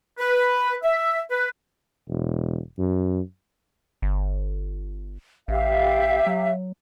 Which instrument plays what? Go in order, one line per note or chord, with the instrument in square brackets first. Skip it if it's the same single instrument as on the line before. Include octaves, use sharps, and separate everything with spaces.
[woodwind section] B4
E5
B4
[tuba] E1
F#2
[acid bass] G1
[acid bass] A1 [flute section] G4 E5 F5
[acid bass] F#3